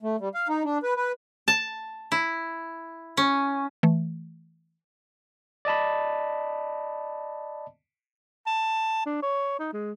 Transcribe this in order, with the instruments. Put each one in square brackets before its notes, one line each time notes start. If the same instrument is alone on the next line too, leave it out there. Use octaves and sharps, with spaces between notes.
[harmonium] A3
G3
F5
D#4
D4
B4
B4
[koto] A5
E4
C#4
[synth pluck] E3 A3
[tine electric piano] D5 D#5 A5 B5
[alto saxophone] A5
D4
C#5
D#4
G#3